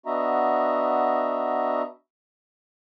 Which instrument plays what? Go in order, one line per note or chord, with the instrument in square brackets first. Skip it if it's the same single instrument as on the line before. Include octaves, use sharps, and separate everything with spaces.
[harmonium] B3 D4 F#4 D#5 E5 A#5